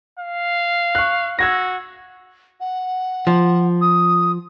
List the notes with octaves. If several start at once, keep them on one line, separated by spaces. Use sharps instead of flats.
F5
C#6 F#6
F#4 E6 G#6 A#6
F#5
F3
D#6